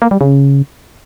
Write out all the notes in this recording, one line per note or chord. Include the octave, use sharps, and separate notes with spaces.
A#3
G3
C#3